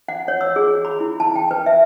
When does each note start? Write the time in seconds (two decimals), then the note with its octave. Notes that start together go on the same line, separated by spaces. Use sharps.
0.08 F#5
0.28 C#5
0.41 E6
0.56 G#4
0.85 B5
1.00 E4
1.20 A5
1.36 G5
1.51 B4
1.66 E5